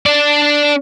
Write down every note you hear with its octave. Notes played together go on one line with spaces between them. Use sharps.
D4 D5